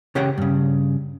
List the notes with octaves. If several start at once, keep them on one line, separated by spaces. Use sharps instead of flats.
C#3 G4 C#5 F#5 G5
G2 C#3